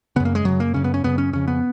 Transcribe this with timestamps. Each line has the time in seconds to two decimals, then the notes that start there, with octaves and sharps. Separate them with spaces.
0.16 C#3 B3
0.20 F#2
0.25 A#3
0.35 G#3
0.45 F#2 C#3 F#3
0.60 A#3
0.74 F#2 C#3 C#4
0.84 B3
0.94 C#4
1.04 F#2 C#3 B3
1.18 C#4
1.33 F2 C#3 C#4
1.48 B3